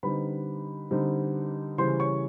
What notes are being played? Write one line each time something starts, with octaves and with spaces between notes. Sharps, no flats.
D3 G3 C4 D#4 B4 B5
D3 G3 C4 D#4
C#3 E3 G3 C5 C6
C#5 C#6